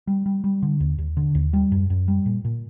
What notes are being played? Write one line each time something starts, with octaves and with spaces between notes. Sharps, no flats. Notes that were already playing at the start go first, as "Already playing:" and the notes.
G3
G3
G3
D3
D#2
D#2
D3
D#2
G3
F#2
F#2
G3
A#2
A#2